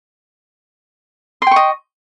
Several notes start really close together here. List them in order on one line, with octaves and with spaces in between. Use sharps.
C6 G5 C#6 D#5